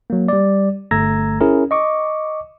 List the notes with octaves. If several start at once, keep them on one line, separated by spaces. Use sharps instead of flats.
F#3 A#3
G3 D5
G1 A3 A#5 E6 G#6 A#6
C#4 E4 G#4 A#4
D#5 C#6 D6